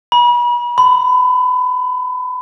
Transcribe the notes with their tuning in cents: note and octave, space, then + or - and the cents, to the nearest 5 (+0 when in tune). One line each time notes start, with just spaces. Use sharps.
B5 -40
B5 +30